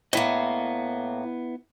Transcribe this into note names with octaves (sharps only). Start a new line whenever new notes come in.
A2 A#3 B3 E4 D#5